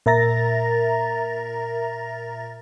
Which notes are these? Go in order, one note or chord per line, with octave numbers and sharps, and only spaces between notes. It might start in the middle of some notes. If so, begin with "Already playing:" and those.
A#2 A#4 E5 A#5 A6 A#6